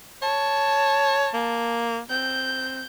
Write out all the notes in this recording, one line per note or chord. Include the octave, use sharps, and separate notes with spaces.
C#5 A5
A#3
C4 G6